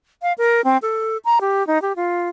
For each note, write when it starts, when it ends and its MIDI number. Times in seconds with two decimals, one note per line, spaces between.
0.22 0.33 77
0.38 0.61 70
0.64 0.78 60
0.82 1.17 69
1.25 1.39 82
1.41 1.66 67
1.67 1.81 63
1.82 1.93 67
1.96 2.29 65